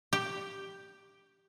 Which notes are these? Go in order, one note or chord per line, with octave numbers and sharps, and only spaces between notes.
G4